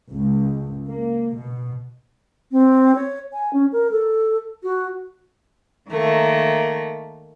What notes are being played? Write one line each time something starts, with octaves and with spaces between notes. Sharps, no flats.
C#2
A#3
B2
C4
C#5
G#5
C#4
A#4
A4
F#4
D#3 A3 A#3